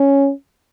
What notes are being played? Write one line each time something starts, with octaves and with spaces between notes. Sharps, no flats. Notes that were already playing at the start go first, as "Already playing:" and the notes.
Already playing: C#4